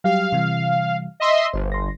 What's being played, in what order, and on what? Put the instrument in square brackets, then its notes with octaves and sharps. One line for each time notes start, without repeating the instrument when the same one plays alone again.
[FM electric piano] F#3 G3 G4 [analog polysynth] F5
[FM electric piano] C3 E3 G3
[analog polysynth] D#5 E5 C6
[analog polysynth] G1 [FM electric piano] C5
[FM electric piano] C6 A#6